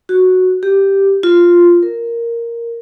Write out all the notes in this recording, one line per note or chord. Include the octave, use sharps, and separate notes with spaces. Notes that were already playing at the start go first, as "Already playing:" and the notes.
F#4
G4
F4
A#4